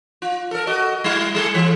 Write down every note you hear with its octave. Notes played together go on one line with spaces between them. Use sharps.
F4
A4 A#4
F#4 D#5
G3 E4
G3 G#4 A4
E3